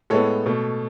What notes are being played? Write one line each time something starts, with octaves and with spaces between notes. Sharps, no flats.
A2 G#3 B3 A4 C#5
B2 A3